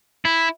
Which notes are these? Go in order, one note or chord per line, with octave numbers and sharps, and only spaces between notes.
E4